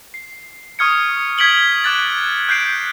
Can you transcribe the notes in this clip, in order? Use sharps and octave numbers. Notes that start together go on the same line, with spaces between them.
C7
C#6 D#6 F6 G#6 C#7
D#6 G#6 B6 D7 F#7 G7
D6 F#6 A6
F#6 G6 C7 D7